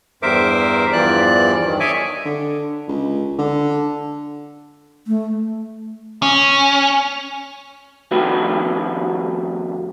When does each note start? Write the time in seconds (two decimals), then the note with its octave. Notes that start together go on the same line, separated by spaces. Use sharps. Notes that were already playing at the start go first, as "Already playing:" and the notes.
0.22 E2 G2 A#4 C5 E5 D6
0.93 E2 G2 E3 F3 D5 F#6
1.65 G2 D#3
1.80 C#5 D#5 E5 G#5 D6
2.25 D3
2.88 C#2
3.38 D3
5.07 A3
6.22 C#4
8.11 F2 D#3 A3 F#4 G4 B4